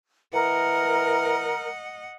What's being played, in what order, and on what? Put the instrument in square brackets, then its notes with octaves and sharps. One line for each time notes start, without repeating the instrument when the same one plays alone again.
[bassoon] E3 [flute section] A#4 [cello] D#5 F#5